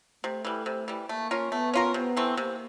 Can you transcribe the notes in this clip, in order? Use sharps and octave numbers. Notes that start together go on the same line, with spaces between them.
C3 A3
E3 G3
C3
E3 G3
A3 A#3
C#4 F4 A#4
A3 B3
C#4 F4 A#4
C3 B3
E3 A3 C4
C3 A#3